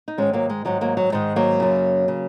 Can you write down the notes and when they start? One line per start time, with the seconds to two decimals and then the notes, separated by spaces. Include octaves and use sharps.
0.08 D#4
0.18 G#2 D#3 G#3 C#4
0.33 F#3 A#3
0.50 G#3
0.65 G#2 D#3 F#3
0.81 F#3 A#3
0.97 F#3
1.12 G#2 D#3 G#3
1.36 F#3 A#3
1.60 F#2 C#3
2.08 C#3